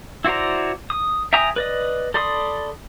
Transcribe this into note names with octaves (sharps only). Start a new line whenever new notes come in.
E4 F#4 C5 D5 A#5
D#6
E5 G5 G#5 A#5 D#6
B4 D5 D#5
A4 D5 B5 C6 D#6